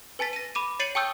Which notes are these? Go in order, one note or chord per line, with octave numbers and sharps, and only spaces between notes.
B4 G#5 A5 A6 B6
A#6 D#7
B5 D6 D#7
C#5 A6 C7 C#7 D#7 F#7
G5 A5 C#6 D#6 E6 G6